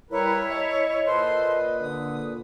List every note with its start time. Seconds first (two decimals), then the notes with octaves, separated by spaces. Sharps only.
0.11 G3 E4 A#4 B4 C#5
0.52 D#5 A5
1.05 A#2 A4 B4 C5 C6
1.81 D3 D#6